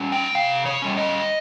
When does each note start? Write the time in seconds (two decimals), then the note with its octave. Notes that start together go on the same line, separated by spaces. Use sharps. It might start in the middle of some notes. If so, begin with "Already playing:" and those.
Already playing: G3 C#4
0.12 G5
0.35 C3 F5
0.65 C#5
0.82 G3 C#4
0.97 D#5